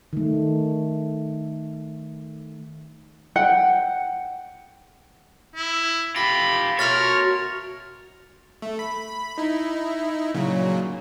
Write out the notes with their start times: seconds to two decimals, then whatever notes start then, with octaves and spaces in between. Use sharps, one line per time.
0.13 D#3 A3
3.36 F#5 G5
5.56 E4
6.16 F4 G4 B5 A#6
6.79 B2 A3 F#4 A#4 C#5 C6 F6 A6
8.62 A3
8.79 B5
9.38 D#4 E4
10.35 A#2 C#3 F#3